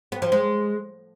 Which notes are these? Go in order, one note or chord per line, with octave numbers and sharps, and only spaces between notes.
B3
F3
G#3